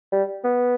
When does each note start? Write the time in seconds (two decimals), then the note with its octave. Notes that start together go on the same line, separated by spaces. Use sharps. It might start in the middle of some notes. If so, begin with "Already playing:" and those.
0.12 G3
0.44 B3